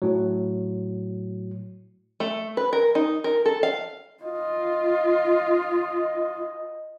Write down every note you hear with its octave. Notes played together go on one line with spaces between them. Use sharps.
A2 F#3
A3
B4
A#4
D#4
A#4
A4
F5
F4 D#5